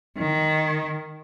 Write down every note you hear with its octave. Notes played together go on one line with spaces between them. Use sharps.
D#3